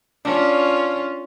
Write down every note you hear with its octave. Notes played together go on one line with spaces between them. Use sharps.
C#4 D4 F4